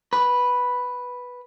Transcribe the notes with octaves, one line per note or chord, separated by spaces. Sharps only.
B4